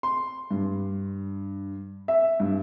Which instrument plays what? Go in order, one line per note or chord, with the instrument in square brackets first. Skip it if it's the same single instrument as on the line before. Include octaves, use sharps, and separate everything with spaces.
[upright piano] C6
G2
E5
G2